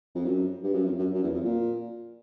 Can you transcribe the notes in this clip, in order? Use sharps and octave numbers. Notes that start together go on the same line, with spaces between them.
F2
F#2
G2
F#2
F2
F#2
F#2
E2
F2
A#2